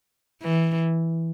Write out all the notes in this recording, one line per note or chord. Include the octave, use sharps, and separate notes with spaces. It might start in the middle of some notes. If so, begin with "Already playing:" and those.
E3